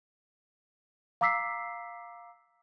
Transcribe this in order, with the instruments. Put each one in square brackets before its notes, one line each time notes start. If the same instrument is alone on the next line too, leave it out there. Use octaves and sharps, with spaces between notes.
[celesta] F5 A#5 D6 E6 B6 C7